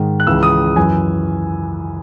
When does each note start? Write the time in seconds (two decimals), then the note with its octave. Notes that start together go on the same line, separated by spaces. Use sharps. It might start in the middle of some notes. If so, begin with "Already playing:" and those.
Already playing: G#2 D#3
0.20 F#6
0.27 C#2 C#3 E3 E6
0.43 D#6
0.76 F#2 E3 G#5